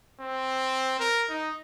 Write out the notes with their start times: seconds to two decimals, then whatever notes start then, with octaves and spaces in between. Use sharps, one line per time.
0.21 C4
1.00 A#4
1.29 D#4